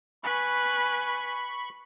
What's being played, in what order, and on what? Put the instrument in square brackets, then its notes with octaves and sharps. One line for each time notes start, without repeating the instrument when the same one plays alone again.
[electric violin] B4 G#5 [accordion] B5 C#6